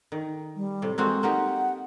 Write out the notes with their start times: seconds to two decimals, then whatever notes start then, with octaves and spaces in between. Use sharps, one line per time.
0.12 D#3
0.56 G3
0.82 A2 C3
0.98 G#3 A#3 C4 F#4
1.23 A#3 D#4 G4 F#5